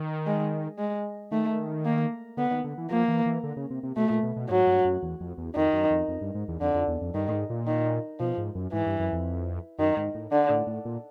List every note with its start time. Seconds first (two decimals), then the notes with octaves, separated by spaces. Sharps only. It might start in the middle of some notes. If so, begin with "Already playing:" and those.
Already playing: D#3
0.26 G#3
0.78 G#3
1.31 D#3 A3
1.85 A#3
2.37 D3 B3
2.51 D#3
2.64 D3
2.78 E3
2.90 F3 A#3
3.08 E3
3.26 E3
3.43 D3
3.57 C#3
3.70 C3
3.83 C3
3.96 B2 A3
4.10 A#2
4.23 B2
4.36 B2
4.49 G#2 F#3
4.67 G2
4.85 F#2
5.03 E2
5.21 F2
5.38 E2
5.55 F2 D#3
5.73 F#2
5.91 F2
6.08 F2
6.21 G2
6.35 G#2
6.48 E2
6.61 F2 D3
6.74 F2
6.88 E2
7.01 F2
7.14 G2 D#3
7.28 A2
7.32 G#2
7.50 A#2
7.67 D#3
8.20 B2 F3
8.38 G#2
8.55 F#2
8.73 G#2 E3
8.87 G2
9.00 F#2
9.13 F2
9.79 F#2 D#3
9.97 G#2
10.15 A2
10.32 D3
10.50 A2
10.67 A2
10.85 A#2